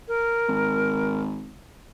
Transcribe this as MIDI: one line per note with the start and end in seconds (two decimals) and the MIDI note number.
0.08 1.21 70
0.49 1.54 32